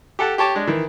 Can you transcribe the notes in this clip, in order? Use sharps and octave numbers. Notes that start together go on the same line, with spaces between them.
G4 A4 F#5 A5
G4 C#5 A5 D6
G#3 D4
D#3 E3